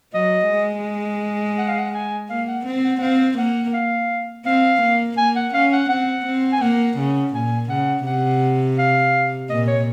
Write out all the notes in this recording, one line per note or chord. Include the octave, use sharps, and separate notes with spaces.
F#3 D#5
G#3
F#5
F5
F#5
G#5
A#3 F5
F#5
C4
F#5
F#5
C4 F5
A#3 F#5
F5
C4 F5
A#3
A#3 G#5
F#5
C#4 F5
F#5
C4 F#5
C4
G#5
A#3 F#5
C#3
A#2 G#5
C#3 F#5
C3 F#5
F5
A#2 D#5
C#5